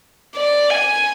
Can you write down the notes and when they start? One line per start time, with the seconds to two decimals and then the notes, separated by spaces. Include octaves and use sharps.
0.36 D5
0.70 G#5